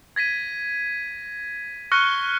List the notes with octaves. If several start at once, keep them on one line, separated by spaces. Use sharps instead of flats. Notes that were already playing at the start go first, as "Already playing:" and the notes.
G#6 A#6 B6 D#7
C#6 F6 F#6 A#6 C#7 G7